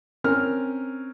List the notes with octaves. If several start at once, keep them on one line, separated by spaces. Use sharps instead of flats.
C4 C#4 A#4 F6